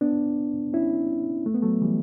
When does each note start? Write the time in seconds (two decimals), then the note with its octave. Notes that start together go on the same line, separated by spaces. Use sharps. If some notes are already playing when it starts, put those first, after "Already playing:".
0.01 B3 D4
0.73 C#4 E4
1.46 A3
1.54 B3
1.62 F#3 A3
1.82 E3 G3